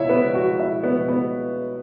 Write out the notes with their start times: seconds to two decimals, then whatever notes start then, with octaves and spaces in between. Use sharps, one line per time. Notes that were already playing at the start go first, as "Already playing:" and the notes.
Already playing: C#2 B2 G#3 E4 C#5 E5
0.09 B3 B4
0.21 B2 G#3 B3
0.34 F#4 F#5
0.59 C#2 E4 E5
0.83 B3 B4
0.97 B2 G#3 B3
1.08 B3 B4